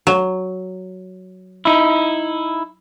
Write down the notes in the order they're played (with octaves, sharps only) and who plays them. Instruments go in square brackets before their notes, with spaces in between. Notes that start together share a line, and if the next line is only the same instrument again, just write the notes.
[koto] F#3
[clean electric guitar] D#4 E4